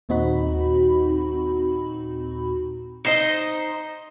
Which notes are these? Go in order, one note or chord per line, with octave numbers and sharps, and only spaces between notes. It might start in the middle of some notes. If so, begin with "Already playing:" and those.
D#2 A#2 C4 D#4 F#4 B5
D#4 C5 D#5